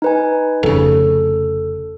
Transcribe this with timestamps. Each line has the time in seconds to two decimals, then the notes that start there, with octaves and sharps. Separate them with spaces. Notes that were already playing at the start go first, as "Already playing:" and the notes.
0.02 D#4 B4 G#5
0.63 F1 C#3 A4